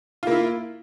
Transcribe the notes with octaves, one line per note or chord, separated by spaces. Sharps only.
A#3 E4 F4